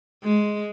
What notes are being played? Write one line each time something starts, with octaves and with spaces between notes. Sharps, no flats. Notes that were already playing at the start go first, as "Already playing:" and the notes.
G#3